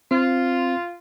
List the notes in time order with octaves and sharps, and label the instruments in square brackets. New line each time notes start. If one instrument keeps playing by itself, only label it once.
[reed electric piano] C4 [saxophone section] F4